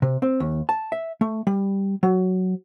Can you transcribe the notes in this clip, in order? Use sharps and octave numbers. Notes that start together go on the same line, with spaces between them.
C3
C4
D#2
A5
E5
A3
G3
F#3